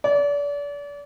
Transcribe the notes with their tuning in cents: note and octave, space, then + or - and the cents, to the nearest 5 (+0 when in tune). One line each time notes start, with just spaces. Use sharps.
D5 -35